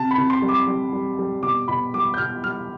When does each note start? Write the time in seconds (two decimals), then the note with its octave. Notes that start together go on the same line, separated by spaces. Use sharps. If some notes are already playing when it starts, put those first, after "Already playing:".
Already playing: C3 A5
0.11 B5
0.18 C3
0.30 C6
0.42 G3
0.49 D6
0.67 G3
0.93 G3
1.19 G3
1.43 B2 D6
1.68 B2 B5
1.94 G3 D6
2.14 G6
2.18 B2 F6
2.43 G3 F6